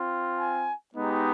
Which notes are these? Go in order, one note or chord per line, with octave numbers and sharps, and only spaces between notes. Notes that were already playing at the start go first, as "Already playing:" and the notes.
Already playing: C4 F4
G#5
G#3 B3 D#4 G4